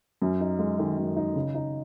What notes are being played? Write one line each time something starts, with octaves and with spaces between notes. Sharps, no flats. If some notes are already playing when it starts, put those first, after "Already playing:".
F#2
D#4
G#3
D#3
F#2
D#4
C#3
D#4